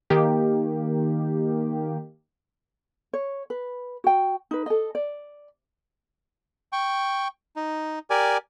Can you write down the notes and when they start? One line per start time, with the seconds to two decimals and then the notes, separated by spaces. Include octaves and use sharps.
0.10 D#3 A#3 G4
3.13 C#5
3.50 B4
4.04 F#4 G5
4.51 D#4 B4
4.66 A4 D#5
4.95 D5
6.72 G5 C#6
7.56 D#4
8.10 G4 A#4 D5 G#5